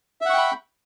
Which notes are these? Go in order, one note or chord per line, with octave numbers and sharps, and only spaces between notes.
E5 F#5 G5 B5 C#6